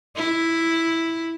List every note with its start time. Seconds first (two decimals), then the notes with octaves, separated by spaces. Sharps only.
0.16 E4